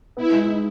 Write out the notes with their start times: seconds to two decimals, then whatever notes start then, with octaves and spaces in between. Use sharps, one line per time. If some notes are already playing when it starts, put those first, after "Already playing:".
0.17 B3 E4
0.32 G#3
0.48 D#4